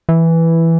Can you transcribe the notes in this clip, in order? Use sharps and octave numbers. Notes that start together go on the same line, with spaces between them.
E3